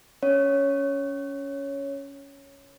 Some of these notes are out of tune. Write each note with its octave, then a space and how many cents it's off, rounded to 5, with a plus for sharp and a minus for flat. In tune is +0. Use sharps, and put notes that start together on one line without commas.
C#4 +15 C#5 +0